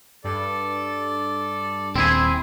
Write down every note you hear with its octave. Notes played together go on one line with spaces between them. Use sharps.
G2 A4 D5
D#1 C4 E4 G#4